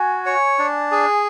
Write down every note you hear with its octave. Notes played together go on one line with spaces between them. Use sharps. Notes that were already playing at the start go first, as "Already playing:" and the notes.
Already playing: F#4 G#5
C#5
D4
G#4